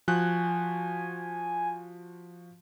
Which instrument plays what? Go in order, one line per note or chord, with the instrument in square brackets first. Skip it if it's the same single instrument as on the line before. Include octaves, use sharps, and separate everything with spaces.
[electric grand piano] F3 F#4 F#6 [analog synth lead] G#5